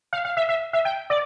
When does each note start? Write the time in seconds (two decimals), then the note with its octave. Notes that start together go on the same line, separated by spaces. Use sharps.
0.13 F5
0.25 F5
0.37 E5
0.49 E5
0.73 E5
0.85 G5
1.10 D5